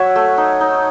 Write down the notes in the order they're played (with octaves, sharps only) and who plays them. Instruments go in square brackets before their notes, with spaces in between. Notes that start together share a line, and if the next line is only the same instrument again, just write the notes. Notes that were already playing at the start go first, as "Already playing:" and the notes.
Already playing: [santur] F#3 C#5 E5 F#5
A3
D#4
D#4